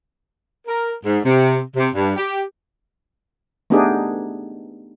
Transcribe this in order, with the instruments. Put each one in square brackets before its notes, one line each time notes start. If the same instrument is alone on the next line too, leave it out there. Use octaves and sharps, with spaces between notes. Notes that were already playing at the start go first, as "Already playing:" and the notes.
[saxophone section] A#4
G#2
C3
C3
G2
G4
[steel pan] A3 B3 D4 D#4 G4 G#4